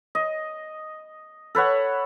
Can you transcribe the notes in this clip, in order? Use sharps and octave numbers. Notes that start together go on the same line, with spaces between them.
D#5
A4 B4 C#5 F#5